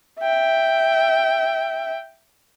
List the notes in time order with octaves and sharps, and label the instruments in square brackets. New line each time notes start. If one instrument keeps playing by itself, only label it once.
[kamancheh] E5 G5